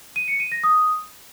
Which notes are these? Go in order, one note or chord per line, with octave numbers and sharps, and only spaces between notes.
D#7
C#7
D#7
A#6
D#6